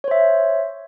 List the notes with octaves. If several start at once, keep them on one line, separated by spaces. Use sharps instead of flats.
C5 C#5 E5